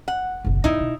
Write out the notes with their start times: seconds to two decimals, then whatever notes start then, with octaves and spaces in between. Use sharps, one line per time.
0.08 F#5
0.45 F#1 B1
0.64 E2 A#2 D#4 E4
0.81 B2